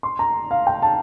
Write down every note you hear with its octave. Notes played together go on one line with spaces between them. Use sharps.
C6
A#5
F5
G5
A5